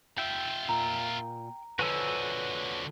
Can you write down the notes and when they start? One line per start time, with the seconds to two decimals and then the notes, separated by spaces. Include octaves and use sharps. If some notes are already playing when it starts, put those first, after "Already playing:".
0.18 F4 E5 G5
0.69 A#2 A#5
1.79 D3 F3 F#4 B4 C#5 G#5 E6